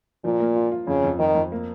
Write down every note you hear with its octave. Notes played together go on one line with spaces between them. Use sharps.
A#2 F3
A#3
F4
F4
F2 C#3
F2
F2 D#3
F2
A#3